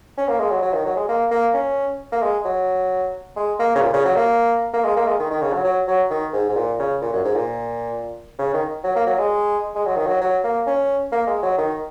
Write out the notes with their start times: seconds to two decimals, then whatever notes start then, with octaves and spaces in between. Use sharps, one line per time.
0.17 C#4
0.28 A#3
0.40 G#3
0.50 F#3
0.62 F#3
0.74 D#3
0.86 F#3
0.97 G#3
1.08 A#3
1.31 A#3
1.54 C#4
2.12 A#3
2.22 G#3
2.45 F#3
3.37 G#3
3.59 A#3
3.75 C#3
3.82 A#2
3.93 C#3
4.05 F#3
4.16 A#3
4.73 A#3
4.84 G#3
4.96 A#3
5.07 G#3
5.19 D#3
5.30 D#3
5.42 C#3
5.53 F#3
5.64 F#3
5.88 F#3
6.10 D#3
6.33 G#2
6.49 G#2
6.56 A#2
6.79 C#3
7.01 A#2
7.13 F#2
7.24 G#2
7.35 A#2
8.38 C#3
8.54 D#3
8.84 F#3
8.95 A#3
9.07 F#3
9.18 G#3
9.75 G#3
9.86 F#3
9.96 D#3
10.07 F#3
10.21 F#3
10.44 A#3
10.67 C#4
11.12 A#3
11.27 G#3
11.43 F#3
11.58 D#3